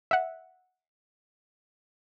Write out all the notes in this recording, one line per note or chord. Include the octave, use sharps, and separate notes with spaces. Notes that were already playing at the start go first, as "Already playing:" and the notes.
E5 F#5